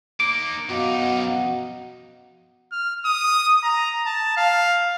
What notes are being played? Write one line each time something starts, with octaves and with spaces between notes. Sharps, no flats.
A#3 D#4 D6
F#2 B2 D#4 D#5 F5 F#5
F6
D#6
A#5
A5
F5